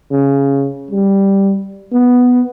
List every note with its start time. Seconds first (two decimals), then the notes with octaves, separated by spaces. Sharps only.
0.12 C#3
0.91 G3
1.93 B3